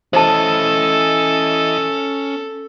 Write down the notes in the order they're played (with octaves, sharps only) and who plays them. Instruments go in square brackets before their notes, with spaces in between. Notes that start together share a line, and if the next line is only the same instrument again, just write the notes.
[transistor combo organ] E3 D#5 [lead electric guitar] C#4 B4 [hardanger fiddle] A4 [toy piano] C5 A5